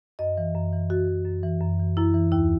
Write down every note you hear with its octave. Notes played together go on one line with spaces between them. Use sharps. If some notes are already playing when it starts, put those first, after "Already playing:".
F#2 D#5
E3
F#2
E3
F#2 F#4
E3
F#2
E3
F#2
E3
F#2 E4
E3
D#2 E4